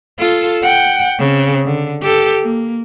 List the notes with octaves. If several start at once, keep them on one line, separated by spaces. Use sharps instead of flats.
F4 A4
F#5 G5
C#3 C4
D3
G4 A4
A#3